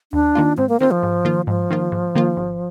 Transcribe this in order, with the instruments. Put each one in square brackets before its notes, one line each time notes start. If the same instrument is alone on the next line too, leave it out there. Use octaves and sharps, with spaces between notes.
[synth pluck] D#2 [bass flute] D4
[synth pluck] D#3 A#3 F4
[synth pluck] G#2 [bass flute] C4
[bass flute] A#3
[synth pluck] D#3 A#3 F4 [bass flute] C4
[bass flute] F3
[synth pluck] G#2
D#3 A#3 F4
[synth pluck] G#2 [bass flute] F3
[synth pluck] D#3 A#3 F4
G#2
D#3 A#3 F4
G#1